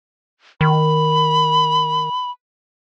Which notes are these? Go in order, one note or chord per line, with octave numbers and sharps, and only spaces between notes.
D#3 B5